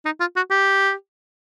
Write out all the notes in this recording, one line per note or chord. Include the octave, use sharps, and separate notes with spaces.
D#4
F4
F#4
G4